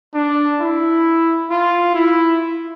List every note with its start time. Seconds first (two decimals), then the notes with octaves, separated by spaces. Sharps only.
0.14 D4
0.60 E4
1.50 F4
1.94 E4